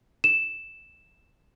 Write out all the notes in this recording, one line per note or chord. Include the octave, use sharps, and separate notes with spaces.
E7